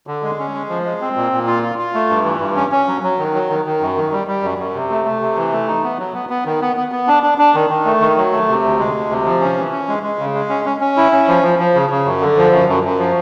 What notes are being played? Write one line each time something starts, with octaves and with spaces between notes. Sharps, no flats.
D3
G#3
C#4
G#3
F3
G#3
C4
A#2
A#2
F4
F4
F4
A3
G2
E3
G2
C#4
C#4
F#3
F#3
D#3
F#3
D#3
D#3
F#2
D#3
G3
G3
F#2
F#2
C3
A3
A3
C3
E3
A3
D#4
B3
F#3
B3
B3
D#3
B3
B3
B3
D4
D4
D4
D#3
D#3
A3
D#3
F#3
A3
C3
D2
G#3
D2
C3
F3
C#4
E3
C#4
G#3
G#3
C#3
G#3
C#4
C#4
C#4
E4
C#4
F3
F3
F3
C#3
C#3
F#2
D3
F3
F#2
F#2
F#2
F3